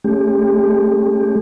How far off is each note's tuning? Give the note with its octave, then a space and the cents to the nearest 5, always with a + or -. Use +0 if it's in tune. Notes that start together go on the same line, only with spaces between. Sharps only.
A3 -25 C#4 +0 G4 +30